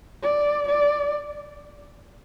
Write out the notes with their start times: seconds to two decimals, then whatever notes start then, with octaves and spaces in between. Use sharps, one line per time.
0.23 D5
0.69 D5